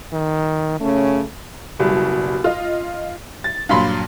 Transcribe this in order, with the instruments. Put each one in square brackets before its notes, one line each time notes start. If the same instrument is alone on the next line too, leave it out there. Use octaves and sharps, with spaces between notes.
[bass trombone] D#3
[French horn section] F#2 C#3 C#4 [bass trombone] A3
[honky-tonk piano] F#1 B2 G3
F4 D#5
A6
[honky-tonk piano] G2 A#2 F#3 [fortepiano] F5 B5 C6